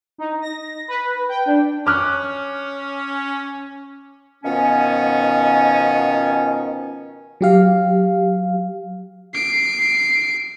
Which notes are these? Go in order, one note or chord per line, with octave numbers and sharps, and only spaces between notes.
D#4
A#6
B4
G5
D4
C#4 D6 F6 F#6
B2 D#3 F3 B3 C#4
F#3 G4 F5
C7 D7